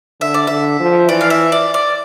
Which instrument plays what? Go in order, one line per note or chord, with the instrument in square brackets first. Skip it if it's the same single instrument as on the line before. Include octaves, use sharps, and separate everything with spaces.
[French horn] D3 [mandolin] E5
[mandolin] D5
[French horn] D3 [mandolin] E5
[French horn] F3
[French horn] E3 [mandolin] D5
[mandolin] F5
E5
D5
D5